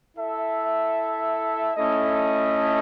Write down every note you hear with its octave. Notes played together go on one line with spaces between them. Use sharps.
E4 A4 E5
A3 C#4 E4 A4 D#5